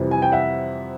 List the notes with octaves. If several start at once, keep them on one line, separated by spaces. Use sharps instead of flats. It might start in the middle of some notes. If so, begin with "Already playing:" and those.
Already playing: F2 C3 E3 G3
G#5
G5
E5 F#5